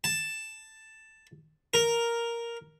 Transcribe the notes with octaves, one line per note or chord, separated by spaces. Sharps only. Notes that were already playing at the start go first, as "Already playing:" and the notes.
A5
A#4